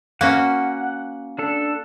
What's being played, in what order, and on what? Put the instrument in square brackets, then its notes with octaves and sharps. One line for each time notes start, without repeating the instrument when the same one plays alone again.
[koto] A#3 C#4 F#4 [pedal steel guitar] F#5
[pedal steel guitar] D4 A4